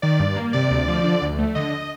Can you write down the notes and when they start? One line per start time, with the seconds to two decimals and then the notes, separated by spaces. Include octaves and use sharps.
0.02 D#3 D5
0.20 G2
0.36 A#3
0.53 C3 D5
0.71 D2
0.88 F3
1.04 D3
1.22 D2
1.39 A3
1.55 D3 D#5